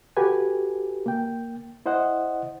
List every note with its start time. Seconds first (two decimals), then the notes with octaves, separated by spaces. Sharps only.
0.17 F#4 G4 A4 B4 G#5
1.06 A#3 G5
1.86 E4 C5 D#5 F#5